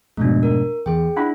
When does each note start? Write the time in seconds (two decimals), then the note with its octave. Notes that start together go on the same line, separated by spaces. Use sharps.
0.17 F2 G#2 B2 A3 D4
0.43 A#4
0.86 E2 G#4 G5
1.17 D4 E4 F#5 B5